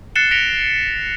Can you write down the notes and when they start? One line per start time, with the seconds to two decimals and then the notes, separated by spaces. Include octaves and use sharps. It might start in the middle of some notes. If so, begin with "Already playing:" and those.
0.15 F#6 A6 C7 C#7 E7 G7
0.31 A#6 B6 C#7 D7 F7 G7